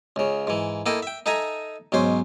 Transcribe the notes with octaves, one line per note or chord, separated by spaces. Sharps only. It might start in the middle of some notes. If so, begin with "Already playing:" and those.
C#2 C#3
G#2 E3
A#3 E4 A4 D#5 G5
E5 G5
D#4 A4 E5 G#5 A#5
B1 G#2 C#4 C5